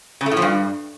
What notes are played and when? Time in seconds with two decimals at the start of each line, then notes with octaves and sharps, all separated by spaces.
0.21 C#3
0.26 A3
0.31 A2
0.37 F3
0.42 G2